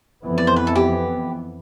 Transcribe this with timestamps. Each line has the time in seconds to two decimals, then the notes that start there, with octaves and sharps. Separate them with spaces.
0.24 F2 E3 B3
0.38 D5
0.47 C5
0.56 B4
0.67 A4
0.75 G4